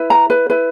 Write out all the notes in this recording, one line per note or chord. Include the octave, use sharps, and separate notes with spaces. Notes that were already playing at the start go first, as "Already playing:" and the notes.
Already playing: E4 B4
A#5
B4
E4 B4